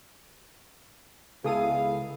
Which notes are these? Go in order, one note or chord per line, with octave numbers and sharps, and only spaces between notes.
C#2 G#3 B3 E4 G#4 A4 F5 D#6